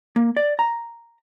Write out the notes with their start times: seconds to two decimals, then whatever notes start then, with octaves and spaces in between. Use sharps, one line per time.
0.16 A#3
0.37 D5
0.59 A#5